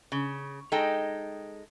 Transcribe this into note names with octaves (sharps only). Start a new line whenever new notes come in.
C#3
G#3 D#4 A4 G5